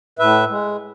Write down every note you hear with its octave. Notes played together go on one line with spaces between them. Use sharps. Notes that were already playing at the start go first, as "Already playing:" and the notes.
A2 B4 E5
G#3